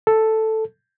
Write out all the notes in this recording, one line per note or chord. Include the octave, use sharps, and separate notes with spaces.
A4